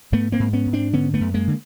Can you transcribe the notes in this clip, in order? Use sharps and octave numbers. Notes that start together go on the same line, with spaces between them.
G#2 A3 B3
A#3 C4
G#2
B3 C#4
G#2
C4 D4
D3 B3 C#4
A3 B3
F#2
G#3 A#3
D3